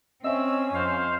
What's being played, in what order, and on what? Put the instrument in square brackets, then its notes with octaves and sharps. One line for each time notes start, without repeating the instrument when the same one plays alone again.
[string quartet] C4 [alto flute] C#4 [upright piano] D#5 E5 [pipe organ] E6
[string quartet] F2 [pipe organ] C5 F5